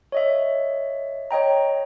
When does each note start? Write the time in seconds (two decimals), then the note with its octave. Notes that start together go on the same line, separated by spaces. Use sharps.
0.12 C#5 D#5 E5
1.31 C#5 D#5 G5 A#5